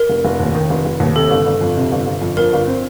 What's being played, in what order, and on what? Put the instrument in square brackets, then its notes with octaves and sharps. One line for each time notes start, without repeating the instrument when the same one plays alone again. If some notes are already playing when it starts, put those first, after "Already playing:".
Already playing: [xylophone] A#4
[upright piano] F1
F1
D#2
D#3
F1
F1
D#2
[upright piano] C3 [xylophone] A4
[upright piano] G1
G1
F2
C3
G1
G1
F2
[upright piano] F3 [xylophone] A#4
[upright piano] G1
C4